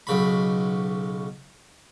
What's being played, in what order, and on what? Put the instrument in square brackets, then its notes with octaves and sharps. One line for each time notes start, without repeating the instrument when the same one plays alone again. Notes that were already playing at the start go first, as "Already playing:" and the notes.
[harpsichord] B1 C#3 B5